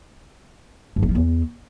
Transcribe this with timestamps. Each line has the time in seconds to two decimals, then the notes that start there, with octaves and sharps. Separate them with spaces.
0.96 G2
1.03 F#3
1.09 F3
1.15 E2